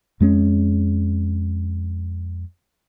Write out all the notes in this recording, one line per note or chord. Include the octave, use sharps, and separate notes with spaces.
F2 G#3 C4 C#4